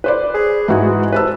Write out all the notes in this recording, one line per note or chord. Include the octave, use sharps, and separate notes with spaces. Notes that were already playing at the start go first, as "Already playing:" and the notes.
B4 C5 D5
G#4
G#2 E3 F#4 G#4
C3 B4 A5 E6